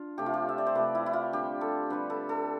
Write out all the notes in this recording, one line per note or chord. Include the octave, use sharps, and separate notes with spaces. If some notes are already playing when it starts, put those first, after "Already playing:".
Already playing: D4 F4
C3 F3 A3 G4
F4
G4
E5
D5
C5
C3 F3 A3 B4
E4
E4
F4
D3 G3 C4 G4
A4
D3 G3 C4 B4
A4
A4